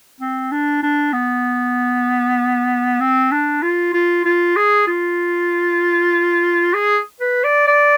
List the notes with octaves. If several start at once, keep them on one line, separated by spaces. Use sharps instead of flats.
C4
D4
D4
B3
C4
D4
F4
F4
F4
G#4
F4
G#4
B4
D5
D5